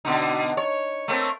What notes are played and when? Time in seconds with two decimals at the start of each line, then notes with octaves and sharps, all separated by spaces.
0.05 B2 D3 D#4
0.57 C#5
1.08 A3 A#3 C4